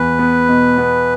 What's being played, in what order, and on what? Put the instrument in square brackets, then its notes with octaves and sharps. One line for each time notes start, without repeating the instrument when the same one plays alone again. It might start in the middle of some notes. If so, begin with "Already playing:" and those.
Already playing: [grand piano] E2 [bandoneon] B4
[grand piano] B3
B2
B3